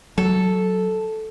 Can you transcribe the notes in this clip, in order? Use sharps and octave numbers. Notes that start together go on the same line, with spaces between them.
F#3 A4